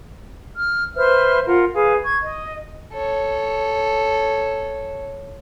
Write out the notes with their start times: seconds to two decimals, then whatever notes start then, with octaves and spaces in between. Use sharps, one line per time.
0.58 F6
0.96 B4 C5 E5 F6
1.47 F4 A#4 F#5
1.74 G#4 B4 F5
2.03 C#6 G#6
2.22 D#5
2.93 A4 C#5